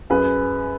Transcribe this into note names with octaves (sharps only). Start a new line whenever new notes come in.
F#2 G#4 B4